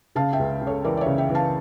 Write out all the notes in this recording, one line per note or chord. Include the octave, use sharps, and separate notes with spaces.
C#3 F5 A5
E5 G5
C#2
C#3
A4 C#5
E3 A#4 D5
D5
C#5 E5
C#3
E5 G5
E3
F5 A5